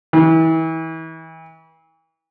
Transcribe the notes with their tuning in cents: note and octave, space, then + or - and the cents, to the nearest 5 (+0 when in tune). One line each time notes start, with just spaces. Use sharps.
E3 -30